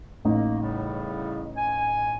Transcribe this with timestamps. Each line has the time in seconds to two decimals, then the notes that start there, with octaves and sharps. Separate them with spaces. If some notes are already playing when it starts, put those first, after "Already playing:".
0.25 A1 A#3 D#4
0.61 A2 C#3 G3
1.57 G#5